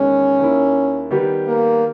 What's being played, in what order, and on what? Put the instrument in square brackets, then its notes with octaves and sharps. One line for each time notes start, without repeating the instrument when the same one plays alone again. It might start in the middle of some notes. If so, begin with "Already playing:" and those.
Already playing: [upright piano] E2 D#3 G#3 [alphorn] C#4
[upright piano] D#2 D#3 A#3 E4
D#3 G3 B3 G4 B4
[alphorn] A#3